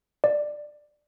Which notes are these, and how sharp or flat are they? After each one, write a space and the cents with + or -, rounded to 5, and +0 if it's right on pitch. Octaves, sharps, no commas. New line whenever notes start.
D5 +10